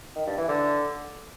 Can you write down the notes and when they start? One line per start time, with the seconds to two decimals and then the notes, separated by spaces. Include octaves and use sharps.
0.16 D#3
0.26 G2
0.37 E3
0.48 D3